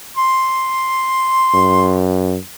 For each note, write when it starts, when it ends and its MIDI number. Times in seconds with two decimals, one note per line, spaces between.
0.16 1.95 84
1.54 2.38 42